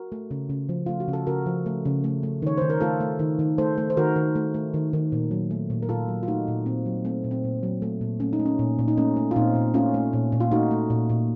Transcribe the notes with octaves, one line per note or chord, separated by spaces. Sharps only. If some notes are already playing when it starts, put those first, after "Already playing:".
Already playing: F#4 A#4
A3
C#3
C#3
F3
A3 F4
F#4
C#3
A4
C#3 F#4 A#4
F3
A3
C#3
A3
A3
D#3 C#5
D#3 C5
A#4
A3 F4 A4
A3
D#3
D#3
A3 A4 C5
A3
C5
D#3 F#4 A#4
D#3
A3
A3
D#3
D#3
A#2
F#3
A3
A#2
A#4
A#2 F4 A4
F#3
F4
A3 D#4 F#4
A#2
A#2 C4
F#3
A3 C4
A#2
C4
A#2
F#3
A3
A#2
A3 C#4
D#4
A3
C#4
A#2
A#2
D#4
A3 C#4
A3
F4
A#2 C4 D#4
A#2
A3 C#4 F4
A3
A#2
A#2
F4
A3 D#4 F#4
A3
A#2
A#2